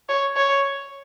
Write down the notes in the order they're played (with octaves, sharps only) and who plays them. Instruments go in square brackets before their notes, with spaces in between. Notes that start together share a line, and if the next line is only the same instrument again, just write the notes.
[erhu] C#5
C#5